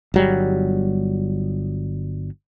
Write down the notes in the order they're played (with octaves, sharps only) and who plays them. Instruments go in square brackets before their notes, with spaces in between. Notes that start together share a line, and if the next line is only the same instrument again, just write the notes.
[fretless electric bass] G1 F#3 G3